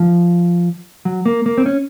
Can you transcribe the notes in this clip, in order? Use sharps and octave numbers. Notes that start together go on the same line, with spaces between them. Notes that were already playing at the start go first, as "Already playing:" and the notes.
Already playing: F3
F#3
A#3
A#3
C4
C#4